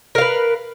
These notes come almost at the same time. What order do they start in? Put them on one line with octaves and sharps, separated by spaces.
A#4 F5 B4